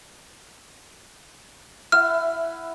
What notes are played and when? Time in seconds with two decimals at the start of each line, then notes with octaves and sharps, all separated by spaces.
1.92 E4 E5 F#5 F6